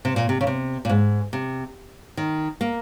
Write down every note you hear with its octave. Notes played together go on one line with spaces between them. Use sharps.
C3
A#2
C3
C#3
C3
A#2
G#2
C3
D#3
A#3